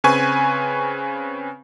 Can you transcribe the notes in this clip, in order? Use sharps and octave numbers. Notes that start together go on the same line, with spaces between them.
C#3 C4 B4 G#5 C#6